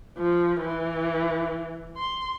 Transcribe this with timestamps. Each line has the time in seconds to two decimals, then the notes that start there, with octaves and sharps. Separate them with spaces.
0.18 F3
0.61 E3
1.98 C6